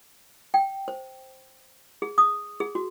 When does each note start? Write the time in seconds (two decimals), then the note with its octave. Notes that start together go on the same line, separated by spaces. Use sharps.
0.54 G5
0.88 C5
2.02 G#4
2.18 D#6
2.60 G#4
2.75 F#4